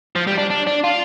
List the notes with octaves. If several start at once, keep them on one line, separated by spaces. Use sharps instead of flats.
F3
G3
D4
D4
D4
F4